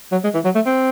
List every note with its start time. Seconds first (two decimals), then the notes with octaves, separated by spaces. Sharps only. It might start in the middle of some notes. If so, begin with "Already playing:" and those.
0.12 F#3
0.24 G#3
0.34 E3
0.45 F#3
0.55 A3
0.66 C4